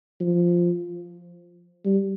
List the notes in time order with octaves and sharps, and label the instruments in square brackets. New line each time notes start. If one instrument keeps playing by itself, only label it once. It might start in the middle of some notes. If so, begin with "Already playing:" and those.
[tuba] F3
G3